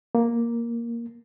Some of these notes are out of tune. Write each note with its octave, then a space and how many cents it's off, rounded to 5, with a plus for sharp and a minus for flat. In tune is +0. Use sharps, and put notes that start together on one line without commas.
A#3 +5